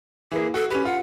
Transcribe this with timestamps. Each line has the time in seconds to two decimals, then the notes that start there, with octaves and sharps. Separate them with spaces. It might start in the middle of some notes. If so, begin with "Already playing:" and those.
0.31 E3 A#3 G#4
0.54 F#4 A4
0.70 C#4 G4 B4
0.85 F4 F#5